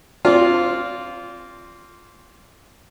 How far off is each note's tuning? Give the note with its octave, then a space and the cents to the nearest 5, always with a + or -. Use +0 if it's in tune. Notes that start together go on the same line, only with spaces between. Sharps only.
C4 +10 F4 -5 D5 -25